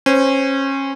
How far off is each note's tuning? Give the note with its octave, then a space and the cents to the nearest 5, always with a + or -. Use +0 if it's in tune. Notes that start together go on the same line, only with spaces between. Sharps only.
C#4 -25 C5 -20